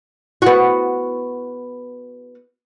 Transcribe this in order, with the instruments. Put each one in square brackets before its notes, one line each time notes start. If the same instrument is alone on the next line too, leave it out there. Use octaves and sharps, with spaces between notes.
[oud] B3 F#4